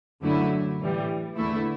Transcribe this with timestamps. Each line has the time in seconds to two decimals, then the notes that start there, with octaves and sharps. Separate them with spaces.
0.22 F#2 D3 F#3 A3 E4
0.80 A2 E3 G3
1.36 E2 D3 A3 E4